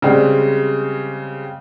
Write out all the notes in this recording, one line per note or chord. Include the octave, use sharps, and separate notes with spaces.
C#3 G3 G#3 C4 G4